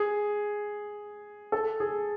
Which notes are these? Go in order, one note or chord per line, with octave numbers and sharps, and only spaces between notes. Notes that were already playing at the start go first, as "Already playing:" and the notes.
Already playing: G#4
A4
G#4